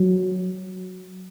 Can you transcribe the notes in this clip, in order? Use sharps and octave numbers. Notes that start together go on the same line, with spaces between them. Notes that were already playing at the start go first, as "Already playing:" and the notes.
Already playing: F#3